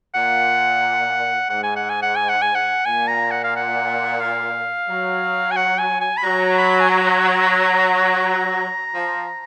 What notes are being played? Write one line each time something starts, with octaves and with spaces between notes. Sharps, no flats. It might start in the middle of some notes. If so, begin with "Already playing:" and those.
A#2 F#5
G#2 F#5
G#5
F#5
G#5
F#5
G#5
F#5
G#5
F#5
A#2 G#5
A#5
F#5
F5
F#5
F5
F#3
G#5
F#5
G#5
G#5
B5
F#3 A#5
B5
G#5
A#5
F3